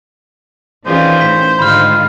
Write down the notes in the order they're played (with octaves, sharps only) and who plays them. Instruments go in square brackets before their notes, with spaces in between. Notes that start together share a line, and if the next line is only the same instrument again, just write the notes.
[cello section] D#3 E3 C#4 [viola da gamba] F4 G#4 D5 [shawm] C5
[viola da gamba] A2 [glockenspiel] B6
[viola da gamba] G#2 D3 D#3 [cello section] G#3 F4 [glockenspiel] B5 F6